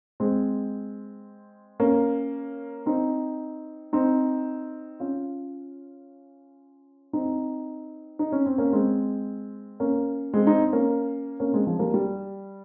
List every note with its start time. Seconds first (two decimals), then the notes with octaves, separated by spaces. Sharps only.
0.20 G#3 C4
1.80 A#3 C#4
2.86 C4 D#4
3.93 C4 D#4
5.00 C#4 F4
7.13 C4 D#4
8.19 D#4
8.32 C#4
8.46 C4
8.58 A#3 C#4
8.73 G#3 C4
9.80 A#3 C#4
10.34 G#3 C4
10.47 C4 D#4
10.73 A#3 C#4
11.40 A#3 C#4
11.53 G#3 C4
11.66 F3 G#3
11.79 G3 A#3
11.94 G3